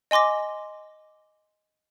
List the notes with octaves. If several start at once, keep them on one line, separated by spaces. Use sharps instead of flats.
D#5 G#5 C6 D6 A#6